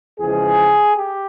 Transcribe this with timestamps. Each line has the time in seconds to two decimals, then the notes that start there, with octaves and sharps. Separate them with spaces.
0.20 E2 C#3 F3 G#3 G#4
0.95 G4